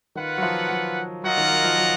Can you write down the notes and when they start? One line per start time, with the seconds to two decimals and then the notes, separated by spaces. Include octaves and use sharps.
0.15 D#3 F4 B4 F#5
0.38 F#3
0.42 F3
0.70 F#3
1.24 F#3 F4 A#4 D#5 F#5
1.37 D#3
1.51 F#3
1.64 F3
1.78 F#3